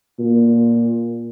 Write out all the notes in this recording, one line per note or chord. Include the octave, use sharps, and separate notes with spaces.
A#2